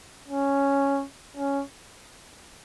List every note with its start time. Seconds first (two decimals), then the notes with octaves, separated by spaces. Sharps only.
0.28 C#4
1.37 C#4